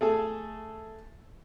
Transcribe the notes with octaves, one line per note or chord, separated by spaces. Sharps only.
A3 G#4 A4